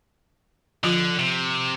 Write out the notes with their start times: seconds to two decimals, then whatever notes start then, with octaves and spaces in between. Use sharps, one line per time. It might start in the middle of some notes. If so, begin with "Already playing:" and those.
0.84 D3 F3 F4
1.19 C3